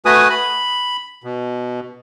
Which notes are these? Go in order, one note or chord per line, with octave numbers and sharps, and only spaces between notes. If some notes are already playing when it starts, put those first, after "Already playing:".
A3 F#4 B4 G#5 D#6
B5
B2